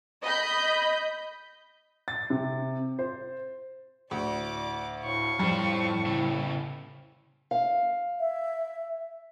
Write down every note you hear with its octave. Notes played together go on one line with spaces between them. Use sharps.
D#5 B5 G6
A6
C3
C5
D2 A2 D5 D6
A2 F5 C#6
F2 A2 G3 C5
C#3 E4
F5
E5